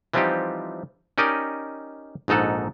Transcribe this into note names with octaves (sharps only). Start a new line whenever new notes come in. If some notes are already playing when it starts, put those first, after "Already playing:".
E3 F3 G3 C4 D#4 G4
C#4 D#4 G4 A#4 D5 D#5
A#1 G#2 D#4 A4 F#5